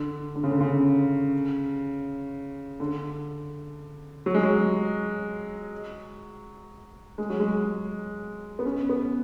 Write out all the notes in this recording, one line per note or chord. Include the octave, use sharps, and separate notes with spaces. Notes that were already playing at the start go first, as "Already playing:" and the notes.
Already playing: D3
D3
C#3
D3
C#3
D3
F#3
G#3
F#3
G#3
F#3
G#3
B3
C#4
B3